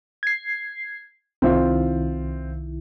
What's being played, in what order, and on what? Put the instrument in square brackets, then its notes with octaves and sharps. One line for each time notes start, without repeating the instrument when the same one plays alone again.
[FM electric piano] G#6 C7
[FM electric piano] C2 D#3 E4 [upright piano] C4 F4